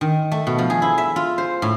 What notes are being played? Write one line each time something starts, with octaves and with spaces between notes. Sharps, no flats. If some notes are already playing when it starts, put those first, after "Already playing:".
D#3
A3
B2
F3
G#4
E4
E5
F4
C5
A2